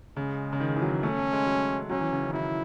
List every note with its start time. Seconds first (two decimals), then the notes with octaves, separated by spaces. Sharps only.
0.17 C#3 G#3
0.53 C#3
0.60 D#3
0.76 E3
0.82 F#3
1.03 A3 C#4
1.18 A3
1.32 G#3
1.47 F#3
1.90 F#3 C#4
2.01 E3
2.12 C#3
2.22 D#3
2.33 F#3 E4